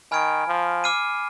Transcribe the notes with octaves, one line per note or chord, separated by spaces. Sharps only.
D#3 G#5 B5 F6 G#6 D7
F3
D6 F6 C7 D#7